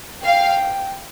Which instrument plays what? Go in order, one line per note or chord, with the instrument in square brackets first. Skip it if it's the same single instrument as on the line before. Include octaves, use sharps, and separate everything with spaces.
[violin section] F5 [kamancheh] G5